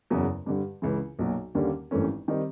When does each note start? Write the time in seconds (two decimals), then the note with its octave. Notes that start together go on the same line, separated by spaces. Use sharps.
0.10 F#1 E2 C#3 F#3
0.46 G2 D3 G3
0.82 C#2 C#3 E3
1.19 B1 A#2 F#3
1.55 D#2 D3 G3 A#3 C#4
1.91 G#1 G2 E3 A3 C#4
2.28 D#3 G3 C4